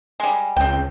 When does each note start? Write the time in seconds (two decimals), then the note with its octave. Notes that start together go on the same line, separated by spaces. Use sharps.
0.20 G3 G#3
0.57 C#2 C4 G5